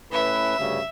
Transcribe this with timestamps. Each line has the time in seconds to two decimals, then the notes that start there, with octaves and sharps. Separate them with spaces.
0.12 A2 C#4 B4 E5
0.59 D2 G2 C#3